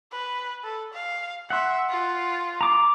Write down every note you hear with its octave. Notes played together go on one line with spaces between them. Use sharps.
B4
A4
F5
E5 F#5 C6
F4
A#5 D6